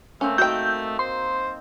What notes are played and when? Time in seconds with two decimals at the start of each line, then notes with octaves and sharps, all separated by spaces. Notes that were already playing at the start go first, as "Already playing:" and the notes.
0.21 A3 A#3 C4 C#4
0.38 D#4 F#4 G5 G6
0.99 C5 C6